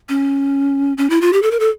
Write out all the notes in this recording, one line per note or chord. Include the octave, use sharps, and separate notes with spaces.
C#4
C#4
E4
F4
G4
A4
A#4
A4